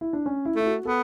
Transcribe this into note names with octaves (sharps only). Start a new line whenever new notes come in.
E4
D4
C#4
E4
A3 E4
F#4
B3 A4